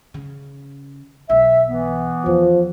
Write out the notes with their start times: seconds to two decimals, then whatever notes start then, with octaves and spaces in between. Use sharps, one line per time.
0.14 C#3
1.29 B1 E5
1.69 E3 B3
2.26 E2 F3